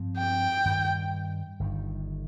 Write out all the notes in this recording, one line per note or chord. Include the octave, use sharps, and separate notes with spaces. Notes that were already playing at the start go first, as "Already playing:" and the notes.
Already playing: G2 F3 C4
G5
G2 D#3 G3
G1 G2 D#3